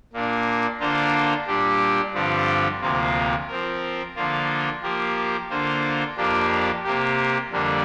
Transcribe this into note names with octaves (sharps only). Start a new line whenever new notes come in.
A#2 A#3 D4
D3 A#3 D4 F4 C5
A#2 G3 D4 G4
G2 D3 F3 C4 G4
D2 C3 F3 A#3 F4
F3 C4 A#4
D3 F3 A#3 F4
F3 A#3 G4 A#4
D3 A#3 F4 C5
F2 F3 A#3 D4 G4
C3 A#3 G4
F2 D3 G3 A#3 D4